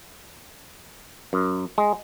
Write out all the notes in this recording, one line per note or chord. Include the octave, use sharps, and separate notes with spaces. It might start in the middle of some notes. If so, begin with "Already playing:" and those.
F#2
G#3